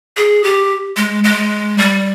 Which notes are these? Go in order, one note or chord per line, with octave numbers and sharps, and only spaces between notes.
G#4
G4
G#3
G#3
G3